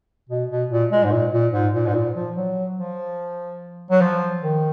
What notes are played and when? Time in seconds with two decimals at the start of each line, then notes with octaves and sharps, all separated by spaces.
0.29 B2
0.50 B2
0.70 A#2
0.92 G#3
1.04 G#2
1.12 A#2
1.32 A#2
1.53 G#2
1.74 A#2
1.87 G#2
1.94 A#2
2.15 F3
2.36 F#3
2.77 F3
3.91 F#3
4.01 F3
4.43 D#3